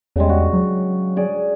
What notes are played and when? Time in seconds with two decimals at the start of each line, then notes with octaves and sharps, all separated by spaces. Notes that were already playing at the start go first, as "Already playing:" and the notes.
0.16 E2 C#3 G3 G#3
0.29 F#4
0.53 F#3
1.17 G#4 D5